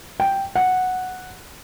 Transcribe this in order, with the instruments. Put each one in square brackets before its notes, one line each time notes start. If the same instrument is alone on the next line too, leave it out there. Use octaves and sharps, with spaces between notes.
[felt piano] G5
F#5